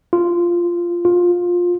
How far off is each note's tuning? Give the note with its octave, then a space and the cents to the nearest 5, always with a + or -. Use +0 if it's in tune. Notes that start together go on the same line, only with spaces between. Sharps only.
F4 -10
F4 +15